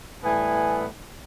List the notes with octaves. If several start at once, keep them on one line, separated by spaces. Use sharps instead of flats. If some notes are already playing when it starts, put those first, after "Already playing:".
A2 E3 G3 B3 G#5